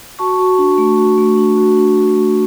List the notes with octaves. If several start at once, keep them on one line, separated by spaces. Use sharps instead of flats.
F#4 A5 C#6
F#4
D4
A3
F#4
A3
D4
F#4
D4
F#4
A3